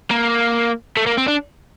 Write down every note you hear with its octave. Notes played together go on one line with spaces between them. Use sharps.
A#3
A3
A#3
C4
D4